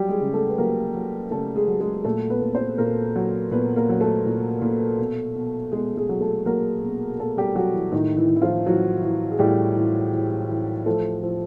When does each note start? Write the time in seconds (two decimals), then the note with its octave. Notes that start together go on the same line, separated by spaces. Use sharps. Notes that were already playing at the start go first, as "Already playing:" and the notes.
Already playing: F#3 G3 G4
0.09 G#3 G#4
0.21 C#3
0.34 A3 A4
0.49 B4
0.58 F#3 A#3 A#4
0.94 F#3
1.31 C#3 A3 A4
1.56 G#3 G#4
1.68 F#3
1.80 G#3 G#4
2.05 A#2 A3 A4
2.30 B3 B4
2.42 A#2
2.54 C4 C5
2.78 A#2 A#3 A#4
3.16 F#3
3.51 A#2 B3 B4
3.76 A#3 A#4
3.89 F#3
4.01 A3 A4
4.26 A#2
4.62 A#2
4.99 B2
5.35 B2
5.72 B2 G#3 G#4
5.96 G#3 G#4
6.09 F#3
6.21 A3 A4
6.45 F#3 A#3 A#4
6.83 B2
7.19 B2 A3 A4
7.37 G3 G4
7.55 F#3 F#4
7.74 E3 E4
7.92 A2 D#3 D#4
8.16 E3 E4
8.29 E3
8.36 E4
8.42 F3 F4
8.65 E3 F#3 F#4
9.02 E3
9.31 G#4
9.39 A2 G3 G4
9.76 E3
10.13 E3
10.49 E3
10.86 F3 A3 A4
11.23 F3